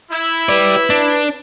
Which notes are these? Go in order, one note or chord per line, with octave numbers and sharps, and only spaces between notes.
E4
G4 B4 D5
D4